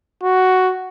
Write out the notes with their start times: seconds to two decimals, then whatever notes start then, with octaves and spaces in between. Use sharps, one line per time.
0.23 F#4